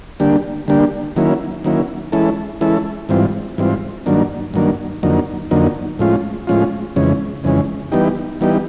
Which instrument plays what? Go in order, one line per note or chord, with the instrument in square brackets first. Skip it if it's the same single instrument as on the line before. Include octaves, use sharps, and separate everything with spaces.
[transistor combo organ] D3 G3 A#3 D4 G4
D3 G3 A#3 D4 G4
D#3 F#3 A#3 C#4 E4
D#3 F#3 A#3 C#4 E4
E3 G#3 C#4 E4 A4
E3 G#3 C#4 E4 A4
G#2 E3 G3 C4 F4
G#2 E3 G3 C4 F4
G2 D#3 F#3 A#3 D4
G2 D#3 F#3 A#3 D4
F2 D3 F#3 A#3 D#4
F2 D3 F#3 A#3 D#4
A2 F3 G#3 C#4 F4
A2 F3 G#3 C#4 F4
F2 C#3 E3 G#3 C#4
F2 C#3 E3 G#3 C#4
E3 G3 B3 D#4 G4
E3 G3 B3 D#4 G4